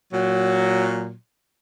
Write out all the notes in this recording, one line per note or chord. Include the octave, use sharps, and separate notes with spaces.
A#2 F#3